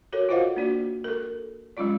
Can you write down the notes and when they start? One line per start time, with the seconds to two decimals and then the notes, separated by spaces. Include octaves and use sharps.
0.13 F#4 A4 A#4 C#5
0.29 F4 F#4 C5 D#5 F5 F#5
0.56 A#3 D4 F#4 D5
1.04 A4 A#4
1.77 F#3 G#3 C#4 F4 D5